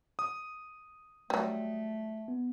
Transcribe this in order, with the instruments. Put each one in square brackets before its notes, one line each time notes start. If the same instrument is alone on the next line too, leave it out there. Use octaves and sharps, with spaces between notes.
[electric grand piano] D#6
[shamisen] F#3 G3 [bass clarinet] A3
[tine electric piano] B3